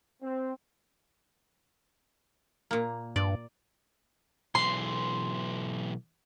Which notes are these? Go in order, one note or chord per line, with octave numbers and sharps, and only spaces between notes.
C4
A#2 A#3
G2 D5
B1 E3 C6